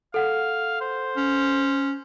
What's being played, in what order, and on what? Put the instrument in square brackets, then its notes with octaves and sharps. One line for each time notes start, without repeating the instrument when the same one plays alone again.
[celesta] A4 F#5 [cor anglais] F5
[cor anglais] C5
[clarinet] C#4